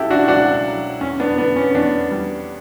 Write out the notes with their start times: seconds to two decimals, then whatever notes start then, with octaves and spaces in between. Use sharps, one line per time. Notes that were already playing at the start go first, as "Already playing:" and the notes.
Already playing: C#2 C#3 E4 F#4 G4 A4
0.10 D4 F#4
0.28 C#2 D4 F#4
0.65 F#3
1.01 E2 C#4
1.20 B3 D4
1.38 D3 B3
1.56 C#4
1.75 E2 B3 D4
2.11 G3